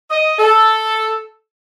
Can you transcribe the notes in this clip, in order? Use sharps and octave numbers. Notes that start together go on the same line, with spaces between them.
D#5
A4